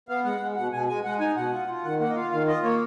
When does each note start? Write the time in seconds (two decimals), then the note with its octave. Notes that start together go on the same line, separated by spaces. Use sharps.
0.09 B3 F5
0.24 G#3 F#5
0.40 G#3
0.56 B2 F#5
0.72 B2 G#5
0.88 G#3 G#5
1.04 G#3 F#5
1.20 D#4 G#5
1.36 B2 F#5
1.52 F4
1.68 F4
1.84 D#3 F#5
2.00 A#3 F#5
2.10 D#5
2.16 F4 F5
2.31 D#3 F5
2.47 F4 D#5
2.63 A#3 C#5